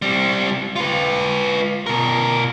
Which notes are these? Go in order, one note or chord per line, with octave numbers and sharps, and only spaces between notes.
G3 C4
F4 B4
B2 A#4